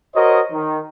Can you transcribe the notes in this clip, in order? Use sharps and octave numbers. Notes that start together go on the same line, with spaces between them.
F#4 A#4 C5 C#5 D#5
D#3